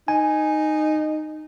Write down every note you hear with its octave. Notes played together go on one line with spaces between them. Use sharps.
D#4 G#5